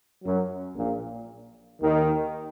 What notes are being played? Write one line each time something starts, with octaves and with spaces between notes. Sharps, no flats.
F#2 F#3
A#1 A#2
D#2 D#3